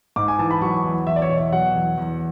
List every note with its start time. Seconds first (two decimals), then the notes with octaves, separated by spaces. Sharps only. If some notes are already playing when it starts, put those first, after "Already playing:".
0.16 G#2 D6
0.28 G#5
0.39 E3 A5
0.51 B5
0.62 F#3 C#6
0.84 E2
1.07 E2 E5
1.16 D5
1.22 C#5
1.29 B2
1.37 E5
1.52 F#3 F#5
1.75 E2
1.98 E2